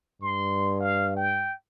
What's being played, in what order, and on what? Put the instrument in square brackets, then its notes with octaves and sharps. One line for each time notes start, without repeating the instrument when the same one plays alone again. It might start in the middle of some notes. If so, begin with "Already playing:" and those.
[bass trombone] G2 [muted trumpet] C6
[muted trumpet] F5
G5